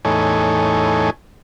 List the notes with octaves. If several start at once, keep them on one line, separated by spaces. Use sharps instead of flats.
E2 A2 D#4 A4 C#5 G#5